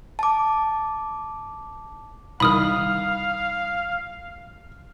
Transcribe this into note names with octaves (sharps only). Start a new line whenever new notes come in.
A5 D6
C2 D#3 F5 B5 D#6 F6